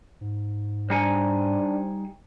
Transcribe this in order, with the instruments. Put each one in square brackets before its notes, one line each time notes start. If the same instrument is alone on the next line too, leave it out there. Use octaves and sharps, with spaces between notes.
[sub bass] G#2
[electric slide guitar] G3 D#4 G#5 [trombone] D4 [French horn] C5